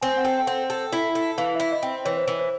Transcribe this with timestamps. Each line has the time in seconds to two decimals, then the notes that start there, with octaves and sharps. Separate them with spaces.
0.01 C4 G#5
0.17 F#5
0.25 A4 G5
0.38 G5
0.47 C4 F#5
0.70 A4
0.92 E4
1.15 A4
1.38 E3 F5
1.55 E4 E5
1.72 D#5
1.83 C4
2.05 E3 C#5
2.17 C5
2.23 E3 C#5
2.39 C5